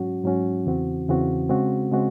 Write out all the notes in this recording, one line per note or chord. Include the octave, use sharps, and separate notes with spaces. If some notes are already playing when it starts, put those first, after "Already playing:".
Already playing: G#2 F#3 C#4 F#4
G#2 F#3 C#4 F#4
E2 C#3 E3 C4 F#4
E2 C#3 E3 C4 F#4
C#3 G#3 C4 F#4
C#3 G#3 C4 F#4